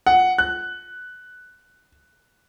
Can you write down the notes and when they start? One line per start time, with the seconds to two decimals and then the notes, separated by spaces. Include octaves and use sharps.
0.06 F#5
0.38 F#6